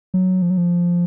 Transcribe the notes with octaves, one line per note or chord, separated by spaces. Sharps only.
F#3
F3
F#3
F3